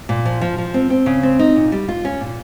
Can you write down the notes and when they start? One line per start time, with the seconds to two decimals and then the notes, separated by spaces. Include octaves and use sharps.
0.09 A#2
0.25 F3
0.41 F3
0.58 F3
0.74 C4
0.90 C4
1.06 C#3
1.23 C4
1.39 D#4
1.56 A#2
1.72 G3
1.88 F4
2.05 C#4
2.21 A#2